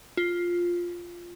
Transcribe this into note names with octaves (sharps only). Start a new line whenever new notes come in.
F4